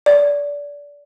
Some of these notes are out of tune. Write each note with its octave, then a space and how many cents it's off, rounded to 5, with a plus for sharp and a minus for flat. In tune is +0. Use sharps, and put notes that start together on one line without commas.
D5 -25